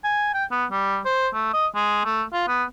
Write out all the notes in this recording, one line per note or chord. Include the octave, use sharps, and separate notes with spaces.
G#5
G5
B3
G3
C5
A3
D#5
G#3
A3
F4
B3